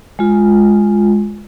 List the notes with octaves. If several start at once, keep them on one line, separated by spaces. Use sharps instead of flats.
G#3 F4